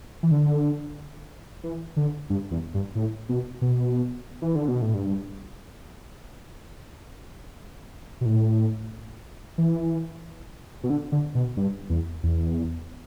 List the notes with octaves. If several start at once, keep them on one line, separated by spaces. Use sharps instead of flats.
E3
D3
E3
D3
G2
E2
G2
A2
B2
B2
E3
D3
B2
A2
G2
B2
A2
E3
B2
D3
D3
B2
G2
E2
E2